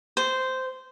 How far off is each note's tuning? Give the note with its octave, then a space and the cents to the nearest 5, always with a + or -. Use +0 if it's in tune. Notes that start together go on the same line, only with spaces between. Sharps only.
C5 -10